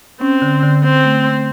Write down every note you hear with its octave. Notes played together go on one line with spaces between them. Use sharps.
C4 C#4
D3
D3
D3 C4
A3
A3